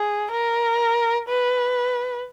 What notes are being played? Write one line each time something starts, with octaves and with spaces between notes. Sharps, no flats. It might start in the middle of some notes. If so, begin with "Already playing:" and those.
Already playing: G#4
A#4
B4